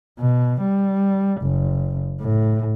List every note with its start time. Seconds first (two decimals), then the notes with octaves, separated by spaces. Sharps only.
0.19 B2
0.61 G3
1.42 F#1
2.20 A2